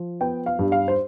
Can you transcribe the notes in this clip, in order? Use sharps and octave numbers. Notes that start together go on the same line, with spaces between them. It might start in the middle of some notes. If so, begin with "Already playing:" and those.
Already playing: F3
B3 G5
F5
G2
F5
C5